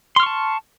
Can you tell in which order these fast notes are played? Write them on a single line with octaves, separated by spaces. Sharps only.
C6 F6 C#6 A5